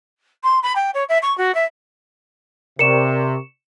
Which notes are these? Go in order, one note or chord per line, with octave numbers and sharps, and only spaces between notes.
C6
B5
G5
C#5
E5
C#6
F#4
E5
C3 A#4 D5 C#6 C#7 E7